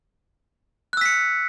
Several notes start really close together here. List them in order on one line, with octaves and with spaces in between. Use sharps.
F#6 E6 B6 C#7